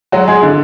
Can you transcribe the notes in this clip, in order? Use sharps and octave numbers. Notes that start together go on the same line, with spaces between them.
F#3 G#3 F#4
G#3 G#4
D3